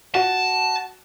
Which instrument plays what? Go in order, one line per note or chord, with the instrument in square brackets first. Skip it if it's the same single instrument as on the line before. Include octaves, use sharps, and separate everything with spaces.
[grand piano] F#4 [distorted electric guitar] A5